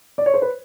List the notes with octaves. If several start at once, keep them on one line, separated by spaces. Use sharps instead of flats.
D5
C#5
C5
B4